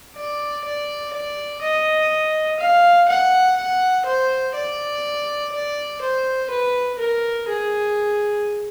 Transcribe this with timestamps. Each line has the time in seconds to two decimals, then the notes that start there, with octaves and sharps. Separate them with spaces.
0.16 D5
0.64 D5
1.13 D5
1.62 D#5
2.60 F5
3.08 F#5
3.57 F#5
4.06 C5
4.55 D5
5.52 D5
6.01 C5
6.50 B4
6.98 A#4
7.48 G#4